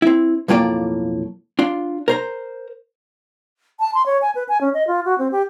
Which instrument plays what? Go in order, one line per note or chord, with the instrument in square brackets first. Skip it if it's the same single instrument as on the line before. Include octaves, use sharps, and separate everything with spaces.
[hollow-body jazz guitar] C4 E4
B1 F2 A2 A#3 F4 D5
D4 F4
A#4 C5 A#5
[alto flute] A5
C6
C#5
G#5
B4
G#5
C#4
D#5
F4
F#4
C4
G4